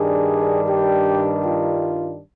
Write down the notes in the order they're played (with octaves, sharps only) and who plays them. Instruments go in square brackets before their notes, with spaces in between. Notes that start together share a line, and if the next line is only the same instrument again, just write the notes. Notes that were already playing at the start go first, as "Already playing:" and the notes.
Already playing: [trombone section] G2 D#3 G3 D4 [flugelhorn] G#4
[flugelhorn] G4
F4